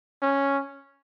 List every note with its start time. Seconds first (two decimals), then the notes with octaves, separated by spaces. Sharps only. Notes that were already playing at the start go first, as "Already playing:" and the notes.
0.22 C#4